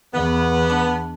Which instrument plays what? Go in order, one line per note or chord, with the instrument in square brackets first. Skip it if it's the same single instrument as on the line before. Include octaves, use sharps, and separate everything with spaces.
[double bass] E2 [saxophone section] B3
[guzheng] D4